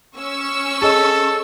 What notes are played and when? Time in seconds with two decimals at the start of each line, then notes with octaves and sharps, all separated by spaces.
0.17 C#4 C#6 E6
0.82 G#4 A4 D#5